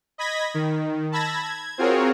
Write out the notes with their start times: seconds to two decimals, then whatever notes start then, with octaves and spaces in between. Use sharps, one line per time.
0.18 D#5 B5 G#6 A#6 B6
0.54 D#3
1.12 A5 B5 E6 G#6 A#6
1.43 G#6
1.78 C4 F4 F#4 G#4 A#4 C#5